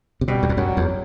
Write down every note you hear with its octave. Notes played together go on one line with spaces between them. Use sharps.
C3
B2 G3
E2
F2
F#2 F#3
E2